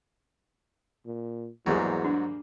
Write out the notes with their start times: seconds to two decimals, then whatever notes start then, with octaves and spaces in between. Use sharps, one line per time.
1.06 A#2
1.66 E2 G#2 F#3 G3 A#3 G#4
2.05 D4